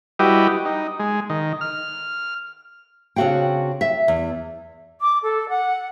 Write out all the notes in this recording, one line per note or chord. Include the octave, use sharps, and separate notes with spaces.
G3 E4 F#4 G4 B4 D#5
D#4
G#3
D#3
F6
C#3 C4 D4 F#4 F5 G5
E5
E2
D6
A4
F#5